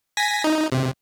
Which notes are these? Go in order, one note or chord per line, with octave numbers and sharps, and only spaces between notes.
G#5 A#6 B6
D#4
C3